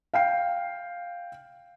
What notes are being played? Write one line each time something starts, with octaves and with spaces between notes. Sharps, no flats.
F5 G5 C7